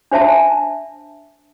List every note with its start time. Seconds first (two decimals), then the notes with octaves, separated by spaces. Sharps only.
0.11 D4 C5 E5 A5